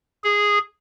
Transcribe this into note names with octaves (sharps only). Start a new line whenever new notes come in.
G#4